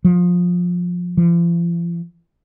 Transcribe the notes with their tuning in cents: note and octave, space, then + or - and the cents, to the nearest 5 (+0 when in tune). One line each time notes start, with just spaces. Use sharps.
F3 +20
F3 -40